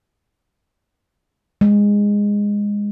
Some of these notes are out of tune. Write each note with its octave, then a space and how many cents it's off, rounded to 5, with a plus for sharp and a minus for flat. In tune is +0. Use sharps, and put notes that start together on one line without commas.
G#3 -15